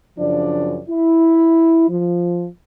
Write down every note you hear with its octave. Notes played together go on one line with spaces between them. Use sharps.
F#2 C#3 F3 D4 D5
E4
F3